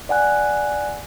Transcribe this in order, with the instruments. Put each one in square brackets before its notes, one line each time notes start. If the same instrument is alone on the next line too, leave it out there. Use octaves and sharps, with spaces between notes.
[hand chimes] D5 F#5 G#5 F#6